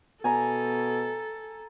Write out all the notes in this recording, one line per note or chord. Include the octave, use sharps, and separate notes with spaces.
B2 A4 G#5 A#5